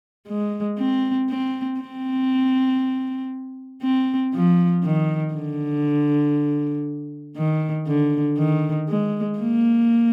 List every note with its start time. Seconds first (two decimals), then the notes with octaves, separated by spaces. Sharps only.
0.28 G#3
0.79 C4
1.30 C4
1.80 C4
3.82 C4
4.34 F3
4.84 D#3
5.34 D3
7.37 D#3
7.87 D3
8.38 D#3
8.89 G#3
9.39 A#3